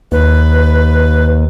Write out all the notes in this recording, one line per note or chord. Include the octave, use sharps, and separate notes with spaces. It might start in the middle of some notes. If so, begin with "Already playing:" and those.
D#2 B4